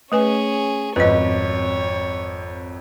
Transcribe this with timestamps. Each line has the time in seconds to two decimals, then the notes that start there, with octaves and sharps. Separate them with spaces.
0.12 A3 C#4 G#4 B4 G#5
0.96 G#1 F2 B4 C#5 D#5